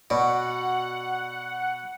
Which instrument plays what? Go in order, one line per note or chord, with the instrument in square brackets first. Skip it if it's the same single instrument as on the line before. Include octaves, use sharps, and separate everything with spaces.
[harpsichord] B2 [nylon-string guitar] F#4 D5 [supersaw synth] F#5